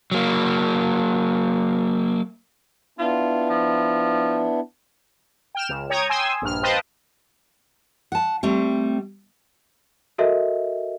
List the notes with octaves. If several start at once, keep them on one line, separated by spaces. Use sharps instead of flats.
F#3 A#3
B3 D4 E4 F4
F3
G5 F6 E7
C#2
C#5 G5 A#5 D#6 G#6
G5 G#5 C6 D#6 E6
A#1 G2 F6
B4 C5 D#5 F5 G5 A5
F#5 A5
G3 A3 C4
F#4 A4 A#4 D#5 E5